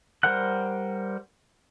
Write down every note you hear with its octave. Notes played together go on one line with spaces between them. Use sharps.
G3 A#4 C5 F#5 F#6